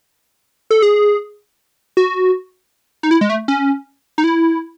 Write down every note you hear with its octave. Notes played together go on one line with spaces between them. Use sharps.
A4
G#4
F#4
D#4
E4
G#3
A3
C#4
D#4
E4